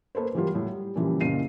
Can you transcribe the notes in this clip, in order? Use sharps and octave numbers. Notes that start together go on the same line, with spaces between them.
A#3 A4 B4 C5
E3 F#3 G3 A#3 F4
A2 F#3
G3
A#2 C#3 E3 F3 G3
F#1 F#2 A#2 F5 C7 D#7